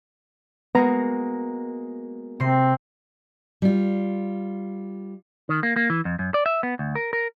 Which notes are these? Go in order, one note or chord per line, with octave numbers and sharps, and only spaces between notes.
G#3 A#3 B3 F#4 A#5
C3 C4 C6
G3 F4
D#3
A#3
A#3
E3
F2
F#2
D5
E5
B3
D2
A#4
A#4